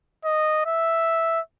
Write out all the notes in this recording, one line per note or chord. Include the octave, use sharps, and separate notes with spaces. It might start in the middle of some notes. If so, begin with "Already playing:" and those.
D#5
E5